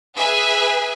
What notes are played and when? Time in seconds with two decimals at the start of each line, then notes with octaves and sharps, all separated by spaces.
0.18 G#4 B4 E5 G#5